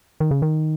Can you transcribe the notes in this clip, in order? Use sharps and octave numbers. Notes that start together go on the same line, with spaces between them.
D#3
C#3
D#3